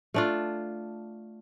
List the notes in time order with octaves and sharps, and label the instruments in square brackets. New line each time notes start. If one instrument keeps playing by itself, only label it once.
[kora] A3 D4 F4